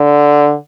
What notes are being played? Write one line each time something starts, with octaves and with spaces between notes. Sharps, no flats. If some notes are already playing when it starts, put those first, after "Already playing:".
Already playing: D3